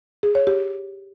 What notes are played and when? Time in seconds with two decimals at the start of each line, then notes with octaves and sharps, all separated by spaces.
0.23 G#4
0.35 C#5
0.47 G4